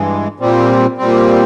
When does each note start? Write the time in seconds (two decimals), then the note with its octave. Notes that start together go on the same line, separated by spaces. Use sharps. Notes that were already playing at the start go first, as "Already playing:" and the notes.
Already playing: G2 E3 G#3
0.40 A#2 G3 C4
0.98 A#2 G3 C4